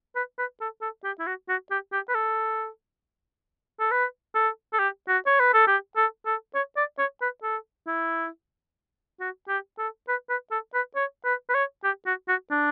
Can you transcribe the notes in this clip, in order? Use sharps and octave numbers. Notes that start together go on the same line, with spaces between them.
B4
B4
A4
A4
G4
E4
F#4
F#4
G4
G4
B4
A4
A4
B4
A4
A4
G4
F#4
C#5
B4
A4
G4
A4
A4
C#5
D5
C#5
B4
A4
E4
F#4
G4
A4
B4
B4
A4
B4
C#5
B4
B4
C#5
G4
F#4
F#4
D4